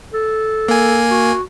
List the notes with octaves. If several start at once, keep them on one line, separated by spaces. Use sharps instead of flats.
A4
A#3 G#5
F#4